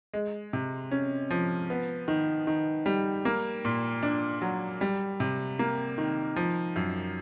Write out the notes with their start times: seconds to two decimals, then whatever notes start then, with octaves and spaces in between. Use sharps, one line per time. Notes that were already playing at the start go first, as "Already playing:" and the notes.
0.14 G#3
0.53 C3
0.91 C#4
1.31 F3
1.70 B3
2.08 D#3
2.47 D#3
2.86 G3
3.25 A#3
3.65 A#2
4.03 D4
4.42 F#3
4.81 G3
5.20 C3
5.59 A#3
5.98 D#3
6.36 F3
6.76 F#2